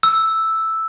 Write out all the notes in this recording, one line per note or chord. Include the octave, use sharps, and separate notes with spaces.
E6